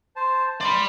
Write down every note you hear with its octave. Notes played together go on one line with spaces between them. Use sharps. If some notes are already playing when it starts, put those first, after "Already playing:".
C5 A5
D5 B5 C6